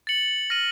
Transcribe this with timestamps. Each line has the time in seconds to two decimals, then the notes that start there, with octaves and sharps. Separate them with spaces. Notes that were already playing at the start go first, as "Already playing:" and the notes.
0.07 A6 C#7 F#7
0.50 F6 A#6 D#7 F#7